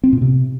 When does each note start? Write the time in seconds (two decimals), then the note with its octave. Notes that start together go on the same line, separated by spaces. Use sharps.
0.04 C4
0.13 A#2
0.22 C3